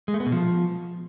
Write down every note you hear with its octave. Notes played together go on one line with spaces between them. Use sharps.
G#3
A3
B3
B2
F3